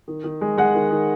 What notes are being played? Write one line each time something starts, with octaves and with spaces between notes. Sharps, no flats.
D#3
D#3
G#3
G#3 F#5
D#3
D#3